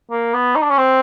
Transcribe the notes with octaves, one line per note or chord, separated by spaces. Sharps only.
A#3
B3
D#4
D4
C#4
C4